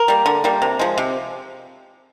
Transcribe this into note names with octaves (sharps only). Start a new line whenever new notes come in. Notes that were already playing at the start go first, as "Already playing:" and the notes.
Already playing: A#4
G3 A#3
D3
G3 A#3
C3
F3 G#3
C3